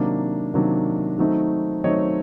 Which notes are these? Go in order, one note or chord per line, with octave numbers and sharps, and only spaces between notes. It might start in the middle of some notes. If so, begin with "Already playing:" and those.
Already playing: C3 D#3 F#3 A#3 D4
C3 D#3 F#3 A#3 D4
D#3 F#3 A3 C4 D#4
D#3 F#3 A3 C4 D#4 C#5 D#5